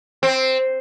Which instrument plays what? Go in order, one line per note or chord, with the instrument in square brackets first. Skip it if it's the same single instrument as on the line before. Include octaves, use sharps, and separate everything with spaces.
[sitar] C4